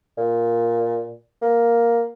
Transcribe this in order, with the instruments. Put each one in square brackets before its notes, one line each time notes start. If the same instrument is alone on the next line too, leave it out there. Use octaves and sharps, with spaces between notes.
[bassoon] A#2
A#3